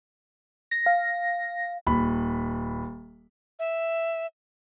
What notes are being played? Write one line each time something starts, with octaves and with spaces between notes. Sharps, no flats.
A#6
F5
D#1 B5
E5